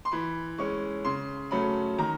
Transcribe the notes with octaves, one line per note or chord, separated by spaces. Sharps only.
C6
E3 B5
G#3 C#4 C#6
C#3 C6
F#3 A3 C#4 B5
D#3 A#5